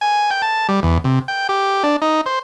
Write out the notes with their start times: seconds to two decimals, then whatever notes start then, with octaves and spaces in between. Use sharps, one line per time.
0.01 G#5
0.31 G5
0.42 A5
0.69 G3
0.83 E2
1.04 C3
1.28 G5
1.49 G4
1.83 D4
2.02 D#4
2.26 C5